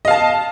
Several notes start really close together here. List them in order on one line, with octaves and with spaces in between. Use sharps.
D#5 F5 A5